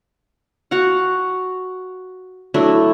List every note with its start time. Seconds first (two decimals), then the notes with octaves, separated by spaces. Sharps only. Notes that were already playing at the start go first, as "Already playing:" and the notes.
0.71 F#4 F5 F#5
2.54 F#3 A3 D4 E4